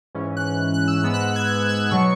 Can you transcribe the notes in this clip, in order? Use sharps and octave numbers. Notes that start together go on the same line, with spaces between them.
G#2 E3 C#4
F#6
F#6
E6
G#2 G#3 B3 E6
F#6
G#6
F#6
E6
B2 F#3 B3 C#6